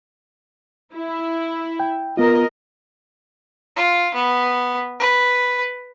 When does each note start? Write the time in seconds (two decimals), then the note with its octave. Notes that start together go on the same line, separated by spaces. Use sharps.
0.94 E4
1.80 G5
2.17 B3 F4 A#4 D#5
3.77 F4
4.15 B3
5.00 B4